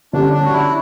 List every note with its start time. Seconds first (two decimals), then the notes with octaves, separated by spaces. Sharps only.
0.13 D3 G3 C#4 D4
0.34 D4
0.45 F#4
0.53 E4